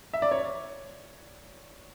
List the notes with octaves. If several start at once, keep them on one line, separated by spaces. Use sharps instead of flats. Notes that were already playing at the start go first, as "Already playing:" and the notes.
E5
D5
C#5